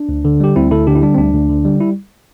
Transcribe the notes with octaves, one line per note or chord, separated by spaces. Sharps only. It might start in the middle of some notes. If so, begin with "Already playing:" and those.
Already playing: D4
D2
D3
G3 G4
D2 C4 E4
D2 E4 A4
D3 D4 G4
E4
G3 D4
C4
D2 D4
D2
D3
G3
E4